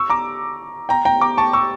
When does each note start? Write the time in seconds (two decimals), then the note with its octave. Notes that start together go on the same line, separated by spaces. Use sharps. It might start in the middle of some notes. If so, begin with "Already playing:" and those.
Already playing: C#6 E6
0.10 A#5 D6
0.89 G5 A#5
1.05 G5 A#5
1.21 A#5 D6
1.37 A5 C#6
1.53 C#6 E6